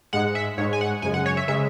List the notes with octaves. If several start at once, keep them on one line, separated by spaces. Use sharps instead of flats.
G#2 G#3 F#5
E5
G#2 G#3 C#5
G#5
F#5
F#2 C#3 G#3 G#5
F#5
C#5
E5
C#3 G#3 E5